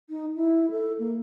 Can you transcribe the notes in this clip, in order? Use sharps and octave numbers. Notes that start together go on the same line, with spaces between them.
D#4
E4
A4
A#3